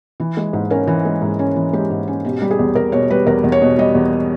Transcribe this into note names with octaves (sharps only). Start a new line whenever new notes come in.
E3
G#3
G#2
C#4 A#4
E3
G#3
G#2
C#4
E3
G#3 G4
G#2
C#4
B2 G4
G3
G#4
E2
E2 A#4
B2 C#5
G3 B4
E2 A#4
E2
C#5
B2
G3 D#5
E2